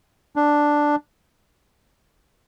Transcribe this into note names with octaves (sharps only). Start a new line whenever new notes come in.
D4